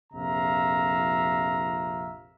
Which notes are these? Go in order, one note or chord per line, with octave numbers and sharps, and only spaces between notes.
A#1 F2 C3 E5 F5 A#5